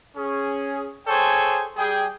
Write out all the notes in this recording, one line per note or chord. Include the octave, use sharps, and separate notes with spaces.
C#4 G#4
G#4 A4 C5 C#5 G5 G#5
G3 G#4 G5